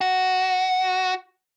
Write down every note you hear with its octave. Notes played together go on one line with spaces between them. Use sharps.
F#4